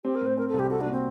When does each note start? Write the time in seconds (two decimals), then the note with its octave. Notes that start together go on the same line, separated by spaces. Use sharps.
0.04 C4 G4
0.15 A#4
0.21 A2
0.26 C5
0.37 C4 A#4
0.49 A4
0.54 C2
0.59 G4
0.70 F#4 A4
0.81 D4
0.86 A#2
0.92 C4